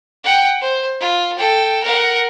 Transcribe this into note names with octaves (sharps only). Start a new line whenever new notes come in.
F#5 G5
C5
F4
A4 G5
A#4 F#5